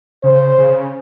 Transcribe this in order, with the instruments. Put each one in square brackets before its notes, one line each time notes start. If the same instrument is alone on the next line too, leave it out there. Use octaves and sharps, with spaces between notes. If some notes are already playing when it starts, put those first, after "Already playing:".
[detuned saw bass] C#3 [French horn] C5
[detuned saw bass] C#3